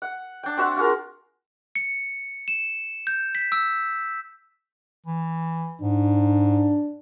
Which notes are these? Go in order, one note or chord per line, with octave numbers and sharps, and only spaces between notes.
F#5
D4 G5
C4 F#4 E5 F#5
F4 F#4 G#4 A#4
C#7
E7
G6
B6
E6
E3
G#2 D4